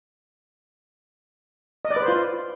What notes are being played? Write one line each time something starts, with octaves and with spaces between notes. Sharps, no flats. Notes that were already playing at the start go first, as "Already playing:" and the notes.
D#5
D5
B4
C5
F4